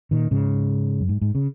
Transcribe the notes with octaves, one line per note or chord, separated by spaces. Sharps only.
A#2 D#3
G#2 C#3
F#2
G#2
G#2
C#3